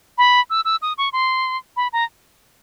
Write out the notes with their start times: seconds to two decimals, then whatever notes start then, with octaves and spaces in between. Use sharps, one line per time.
0.18 B5
0.50 E6
0.65 E6
0.82 D#6
0.98 C#6
1.13 C6
1.77 B5
1.93 A#5